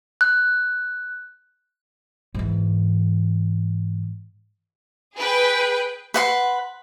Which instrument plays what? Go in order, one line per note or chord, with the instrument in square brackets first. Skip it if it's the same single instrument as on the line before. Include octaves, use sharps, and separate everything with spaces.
[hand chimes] F#6
[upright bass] G#2 E3
[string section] G#4 B4 G5
[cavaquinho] B4 F#5 C6